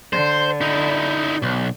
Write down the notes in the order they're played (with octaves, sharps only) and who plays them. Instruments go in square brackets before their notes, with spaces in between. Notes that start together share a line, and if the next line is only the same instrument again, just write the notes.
[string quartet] D3 [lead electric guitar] C5
[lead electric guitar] D#4 E4
B1